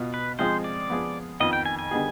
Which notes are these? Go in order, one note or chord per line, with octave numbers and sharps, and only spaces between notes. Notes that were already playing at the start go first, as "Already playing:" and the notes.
Already playing: B2 B3 F4
B4
F3 G#3 C4 F4 G#4 C5
D5
F3 B3 F4 G#4
F2 D#3 B3 F4 D#5
G5
G#5
G#5
D3 G3 B3 D#4 G#4